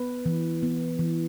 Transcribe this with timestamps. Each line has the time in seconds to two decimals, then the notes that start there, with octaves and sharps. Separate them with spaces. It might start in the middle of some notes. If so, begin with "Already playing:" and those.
Already playing: B3 B4
0.26 E3
0.62 B3
0.99 E3